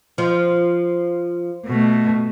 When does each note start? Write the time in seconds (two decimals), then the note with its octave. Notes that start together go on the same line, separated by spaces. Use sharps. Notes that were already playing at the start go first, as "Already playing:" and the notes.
0.18 F3
1.66 B2 A3